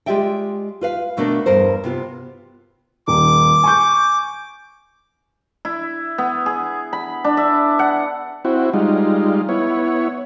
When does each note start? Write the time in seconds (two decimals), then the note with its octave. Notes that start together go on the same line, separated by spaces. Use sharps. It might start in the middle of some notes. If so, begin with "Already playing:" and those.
0.06 G#3 F4 G4 D5 E5 G5
0.81 F4 B4 F5
1.17 B2 A3 B3 D4 A4 A#4
1.46 E2 G2 A#4 C5
1.84 C3 B3 F4
3.08 D#1 D6
3.63 G#5 C#6 G6
5.65 E4
6.18 B3
6.46 G#4
6.93 B5
7.24 D4
7.37 E5
7.79 F#5
8.45 C4 E4 F#4
8.73 G3 G#3 D#4 F4
9.49 B3 E4 C#5